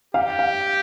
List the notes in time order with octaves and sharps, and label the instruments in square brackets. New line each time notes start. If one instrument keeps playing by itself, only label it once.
[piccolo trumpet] G4 [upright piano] F5
[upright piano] F5